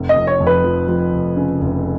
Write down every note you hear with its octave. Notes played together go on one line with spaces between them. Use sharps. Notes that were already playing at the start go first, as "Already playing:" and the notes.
Already playing: F1
D#5
F2
C#5
F2
B4
F3
F3
F1
C#3
F1